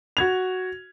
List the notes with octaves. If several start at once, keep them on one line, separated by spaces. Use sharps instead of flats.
F#4 G#6 F7